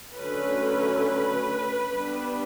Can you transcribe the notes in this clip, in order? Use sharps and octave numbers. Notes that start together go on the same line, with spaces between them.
D3 F#3 A3 C#4 B4
G3 B3 D4